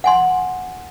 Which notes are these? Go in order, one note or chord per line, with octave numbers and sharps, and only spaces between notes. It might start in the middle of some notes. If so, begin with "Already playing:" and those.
F#5 G#5 C6